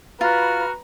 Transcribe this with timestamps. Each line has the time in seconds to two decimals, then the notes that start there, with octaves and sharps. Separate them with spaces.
0.21 F4 F#4 B4 A#5 B5 F6